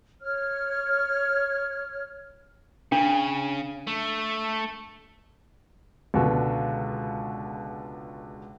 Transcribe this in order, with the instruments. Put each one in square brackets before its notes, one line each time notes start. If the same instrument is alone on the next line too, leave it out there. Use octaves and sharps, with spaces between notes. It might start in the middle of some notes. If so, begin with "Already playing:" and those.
[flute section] C#5 F6
[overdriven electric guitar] C#3 [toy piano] D4
[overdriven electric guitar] A3
[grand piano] C#2 B2 D3